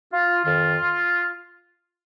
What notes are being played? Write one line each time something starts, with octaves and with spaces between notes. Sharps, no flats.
F4
F2 D#3 F4